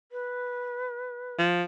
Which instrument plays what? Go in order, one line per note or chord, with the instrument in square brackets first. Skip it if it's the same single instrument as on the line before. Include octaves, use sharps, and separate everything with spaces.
[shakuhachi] B4
[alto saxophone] F3